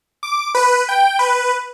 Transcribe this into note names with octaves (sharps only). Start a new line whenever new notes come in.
D6
B4
G5
B4